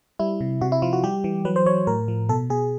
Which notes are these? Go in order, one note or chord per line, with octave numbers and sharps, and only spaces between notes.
G3 E4
C3
C3 F#4
E4
F3 F4
F#4
G3 G4
E3
F#3 B4
C5
F#3 C#5
A2 A#4
F3
B2 A4
B2 G#4